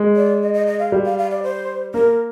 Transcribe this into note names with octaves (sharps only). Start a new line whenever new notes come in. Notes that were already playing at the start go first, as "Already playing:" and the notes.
Already playing: G#3
D5
D#5
D#5
D#5
F5
G3
F5
F5
D5
C5
A#3 A#4